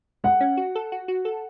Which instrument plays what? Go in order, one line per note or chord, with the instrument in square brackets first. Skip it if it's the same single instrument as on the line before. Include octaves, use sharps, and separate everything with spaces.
[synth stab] G#3 [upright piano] F#5
[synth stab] C#4
F#4
A4
F#4
F#4
A4